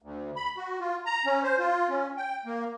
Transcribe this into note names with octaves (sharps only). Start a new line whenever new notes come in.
D2
B5
F#4
F4
A#5
C#4
C5
F4
C#4
G5
A#3